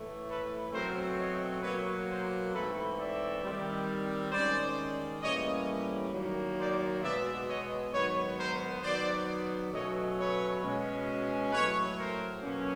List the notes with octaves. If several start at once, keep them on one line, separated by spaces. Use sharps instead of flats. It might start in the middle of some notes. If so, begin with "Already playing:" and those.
Already playing: A2 E3 A3
A4 B4
B2 F#3 A3 C4 A#4 C5
C#5 D#5
B2 F#3 A#3 B4 C#5
A#4 C5
G#2 E3 A3 C4 A4 B4
D5 E5
D#3 G3 C4
D#3 G#3 C#4 C5 D5
A2 E3 G3 A#3 C#4 C#5 D#5
D#3 F#3 A#3
C5 D5
B2 G#3 B3 D5 E5
C#5 D#5
G#2 D#3 F#3 B3 B4 C#5
A#4 C5
D#3 F#3 B3 C5 D5
B2 F#3 A3 C#4 C#5 D#5
B4 C#5
B2 G#3 C#4
A2 F#3 A3 B4 C#5
A#4 C5
B2 F#3 A#3 C#4